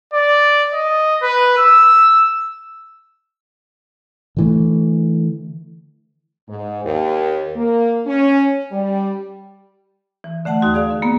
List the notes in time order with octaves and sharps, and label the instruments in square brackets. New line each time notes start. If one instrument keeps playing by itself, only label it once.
[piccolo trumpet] D5
D#5
B4
E6
[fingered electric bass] D3 E3 A3
[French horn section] G#2
D#2
A#3
C#4
G3
[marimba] E3
D3 A3 F#5 A5
D#2 D#4 F#4 C6
G#4 D5 F5
D3
A#3 B3